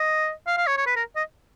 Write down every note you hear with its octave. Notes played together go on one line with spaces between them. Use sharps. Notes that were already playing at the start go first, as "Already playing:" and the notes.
Already playing: D#5
F5
F5
C#5
C#5
B4
A#4
D#5